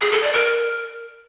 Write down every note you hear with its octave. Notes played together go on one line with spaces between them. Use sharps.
G#4
A4
D5
A#4